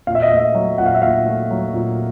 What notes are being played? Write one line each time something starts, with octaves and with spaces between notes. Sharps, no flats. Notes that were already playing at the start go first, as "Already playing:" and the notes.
A#2 F5
E5
D#5
A3 E5
F#3
A#2 F#5
F5
E5
A#2 F5
A3
F#3
A#2